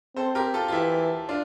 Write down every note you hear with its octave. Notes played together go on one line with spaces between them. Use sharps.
C4 A4 C5
G4 A#4
F4 A4
F4
E3 E4 G4
D4 F4